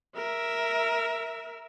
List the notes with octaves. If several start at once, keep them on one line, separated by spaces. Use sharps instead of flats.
A#4 E5